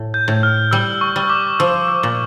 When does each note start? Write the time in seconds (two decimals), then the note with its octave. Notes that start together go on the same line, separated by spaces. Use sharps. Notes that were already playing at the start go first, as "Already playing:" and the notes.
Already playing: A2
0.14 G6
0.28 A2
0.43 F6
0.71 G3 E6
1.01 C#6
1.16 G3
1.29 D6
1.59 F3 E6
1.88 E6
2.03 A#2